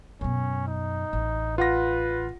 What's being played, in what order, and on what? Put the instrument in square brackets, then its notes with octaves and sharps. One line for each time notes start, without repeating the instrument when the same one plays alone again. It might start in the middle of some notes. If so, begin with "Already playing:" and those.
[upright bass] F#2 B2 [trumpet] C#4
[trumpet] D#4
[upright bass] A1
[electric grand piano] F4 F#5 A#6 [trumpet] B4